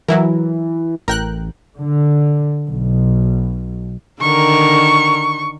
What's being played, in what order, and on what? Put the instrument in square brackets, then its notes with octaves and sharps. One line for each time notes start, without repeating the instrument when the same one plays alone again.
[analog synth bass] E3 [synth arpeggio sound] F#3 E4 A#4
[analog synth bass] A1 [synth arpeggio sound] A#4 G5 F#6
[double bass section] D3
B1
[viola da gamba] D3 D#3 A#4 [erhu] C#6